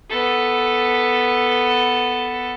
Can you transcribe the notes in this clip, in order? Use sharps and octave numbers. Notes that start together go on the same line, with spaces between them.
B3 A4